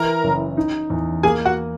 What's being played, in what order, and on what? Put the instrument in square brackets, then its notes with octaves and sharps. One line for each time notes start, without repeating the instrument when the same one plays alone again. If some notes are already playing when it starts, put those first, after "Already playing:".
Already playing: [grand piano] E3 [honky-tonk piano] A#4 A#5
[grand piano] F#1
D#4
E2
[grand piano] A#3 [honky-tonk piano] G#4 G#5
[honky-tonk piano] F#4 F#5